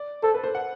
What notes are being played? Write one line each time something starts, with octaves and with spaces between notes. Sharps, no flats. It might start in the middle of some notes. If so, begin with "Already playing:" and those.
Already playing: D5
A4 C5
B4
C5
F#5